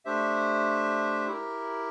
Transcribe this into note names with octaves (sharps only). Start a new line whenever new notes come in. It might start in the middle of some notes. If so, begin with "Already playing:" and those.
A3 D4 G4 C5 E5
E4 G4 A#4